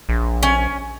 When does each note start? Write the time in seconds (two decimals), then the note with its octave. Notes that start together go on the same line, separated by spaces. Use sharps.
0.09 A#1
0.43 C#4 G#5